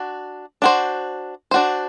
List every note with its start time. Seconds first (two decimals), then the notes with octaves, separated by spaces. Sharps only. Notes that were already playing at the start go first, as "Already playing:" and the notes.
Already playing: D4 F#4
0.62 D4 F#4 C5
1.51 D4 F#4 C5